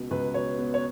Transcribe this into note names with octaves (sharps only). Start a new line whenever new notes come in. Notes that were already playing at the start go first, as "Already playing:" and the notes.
Already playing: C#2 B2
C#2 B4
B2 C#5
B3
C#5